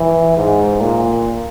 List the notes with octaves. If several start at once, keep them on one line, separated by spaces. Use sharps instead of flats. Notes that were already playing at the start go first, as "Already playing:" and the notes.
Already playing: E3
G#2
A#2